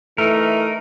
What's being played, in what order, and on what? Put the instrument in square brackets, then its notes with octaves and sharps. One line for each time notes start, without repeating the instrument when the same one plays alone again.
[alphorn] E3 [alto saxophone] A3 [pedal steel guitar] D#4 A#4